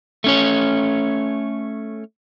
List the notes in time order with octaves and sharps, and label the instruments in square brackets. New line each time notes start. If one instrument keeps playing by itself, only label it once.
[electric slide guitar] A3 C#4 C#5